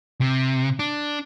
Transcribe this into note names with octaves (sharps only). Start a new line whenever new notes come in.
C3
D4